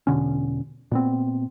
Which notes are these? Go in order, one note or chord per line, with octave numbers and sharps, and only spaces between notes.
E1 B2 D3 C#4
A#2 B3 C4